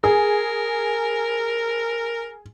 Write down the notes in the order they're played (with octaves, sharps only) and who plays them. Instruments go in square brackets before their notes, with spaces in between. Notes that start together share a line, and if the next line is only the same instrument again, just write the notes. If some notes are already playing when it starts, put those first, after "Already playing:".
[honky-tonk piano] G#4 [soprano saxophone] A#4